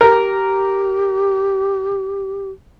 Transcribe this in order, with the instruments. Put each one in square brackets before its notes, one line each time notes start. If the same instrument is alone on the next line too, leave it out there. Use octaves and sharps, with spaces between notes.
[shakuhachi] G4 [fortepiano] A#4